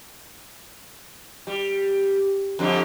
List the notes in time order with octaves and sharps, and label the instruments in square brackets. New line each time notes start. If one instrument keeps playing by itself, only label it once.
[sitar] G3
F2 D3 G3